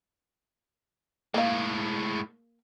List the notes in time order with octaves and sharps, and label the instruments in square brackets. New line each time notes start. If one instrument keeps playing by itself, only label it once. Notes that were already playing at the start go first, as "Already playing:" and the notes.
[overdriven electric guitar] A2 G#3 [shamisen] A#3 F5